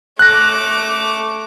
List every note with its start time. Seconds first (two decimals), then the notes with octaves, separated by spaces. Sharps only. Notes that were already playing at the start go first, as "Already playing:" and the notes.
0.19 A3 D6 F#6 A#6